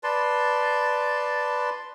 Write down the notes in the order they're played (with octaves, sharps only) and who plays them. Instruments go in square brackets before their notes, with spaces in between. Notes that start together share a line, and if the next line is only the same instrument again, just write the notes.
[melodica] B4 D5 A5 C6